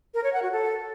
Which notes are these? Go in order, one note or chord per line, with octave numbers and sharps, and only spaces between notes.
A#4
C#5
F#5
F#4
A4